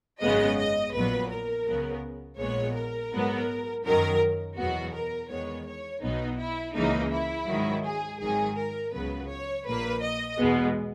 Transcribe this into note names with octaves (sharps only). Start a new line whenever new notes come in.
G#1 F#2 C#3 G#3 B3 D#5
D#5
A#1 A#2 F#3 B3 B4
A#4
C#2 C#3 F#3 B3
A#1 A#2 G#3 B3 C#5
A#4
G#2 F#3 B3
F#2 D#3 F#3 A#4
E2 B2 F#3 B3 F#4
A#4
E2 D#3 G#3 B3 C#5
C#5
B1 B2 F#3 B3 D#4
E4
C#2 C#3 E3 A#3 D#4
E4
G#2 D#3 F#3
G#4
G#1 G#2 D#3 F#3 G#4
A#4
C#2 C#3 F#3 B3 B4
C#5
A#1 A#2 A#3 B4
D#5
E2 B2 G#3 B3